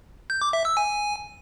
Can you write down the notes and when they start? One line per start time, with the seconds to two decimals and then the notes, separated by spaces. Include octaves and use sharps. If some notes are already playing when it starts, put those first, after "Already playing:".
0.30 G6
0.42 D6
0.53 E5
0.65 E6
0.77 G#5